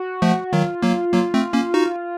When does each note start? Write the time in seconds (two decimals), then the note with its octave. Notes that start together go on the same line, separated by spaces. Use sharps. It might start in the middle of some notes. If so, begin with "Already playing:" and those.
Already playing: F#4
0.22 F3 A3
0.53 D#3 F#3 F4
0.83 F#3 A#3
1.13 F#3 A#3
1.34 A3 C4
1.54 A#3 C#4
1.74 D#4 F#4